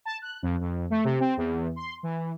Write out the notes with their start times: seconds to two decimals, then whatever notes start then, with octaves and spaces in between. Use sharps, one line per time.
0.05 A5
0.22 F#6
0.42 F2
0.61 F2
0.90 A3
1.04 C3
1.20 C4
1.37 E2
1.76 C6
2.03 E3